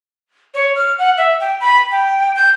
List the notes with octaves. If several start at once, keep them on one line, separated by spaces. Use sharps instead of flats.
C#5
F6
F#5
E5
G5
B5
G5
G6